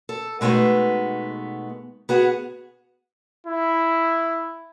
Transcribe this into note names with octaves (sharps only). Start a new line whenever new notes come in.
A4
B2 G#3 A3 B3 D#4
B3 F#4 G#4
E4